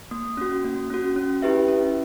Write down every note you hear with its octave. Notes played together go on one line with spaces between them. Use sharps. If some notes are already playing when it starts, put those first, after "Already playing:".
A#3
C#4 F#4
A#3
C#4 F#4
C#4
E4 G4 B4 E5
C#4